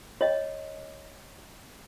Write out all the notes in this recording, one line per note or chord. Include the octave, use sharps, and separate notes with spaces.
C#5 D#5